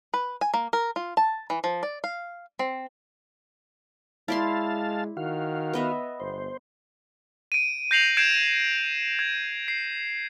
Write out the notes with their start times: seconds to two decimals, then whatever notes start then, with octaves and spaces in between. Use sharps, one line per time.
0.14 B4
0.41 G#5
0.54 A#3
0.73 A#4
0.96 F4
1.17 A5
1.50 E3
1.64 F3
1.83 D5
2.04 F5
2.59 C4
4.28 G#3 E4 D5 F5 A5 C6
5.17 D#3 F#4 F5
5.73 B3 D#5 E5
6.20 G1 C5
7.52 D7 D#7
7.91 G6 A#6 C7 F7 F#7
8.17 G6 G#6 C7 D7 E7
9.19 G#6
9.68 C7